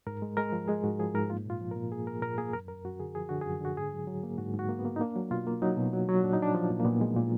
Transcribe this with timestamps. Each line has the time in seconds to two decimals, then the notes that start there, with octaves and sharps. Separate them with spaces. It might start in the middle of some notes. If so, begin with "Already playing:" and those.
0.07 G#2 A#4
0.22 G#3
0.37 G#3 A#4
0.52 F3
0.68 G#3 G#4
0.84 G#2 F#4
0.99 F3 G#4
1.15 G#2 A#4
1.30 A#3 F4
1.45 A#2 F4
1.61 F3
1.71 A#4
1.76 A#2
1.91 A#3 G#4
2.07 A#3 A#4
2.22 A#2 A#4
2.38 A#3 G#4
2.53 F#2 A#4
2.68 F#2 A#4
2.84 F#2 F#4
3.00 D3 G#4
3.15 F3 G#4
3.29 D3 F#4
3.41 F#2 G#4
3.61 D3 F#4
3.77 G#2 G#4
3.93 F#3
4.07 F#3
4.23 A#3
4.38 G#2 F#4
4.53 G#2
4.59 F#4
4.69 A#3
4.79 B3
4.85 A#3
4.96 D#4
5.00 A#3 D4
5.16 F#3
5.31 B2 F4
5.47 A#3
5.62 F#3 D#4
5.77 B2
5.93 F#3
6.09 F#3
6.24 A#2 D4
6.33 D#4
6.39 F3 D4
6.55 F3
6.70 A#2
6.80 A#3
6.85 A#2 B3
7.01 G#3
7.17 A#2